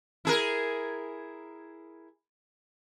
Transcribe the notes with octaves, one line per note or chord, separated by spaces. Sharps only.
E4 G#4 A#4